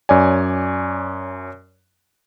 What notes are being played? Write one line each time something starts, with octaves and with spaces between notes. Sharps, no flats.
F#2 C#5 D5 G#5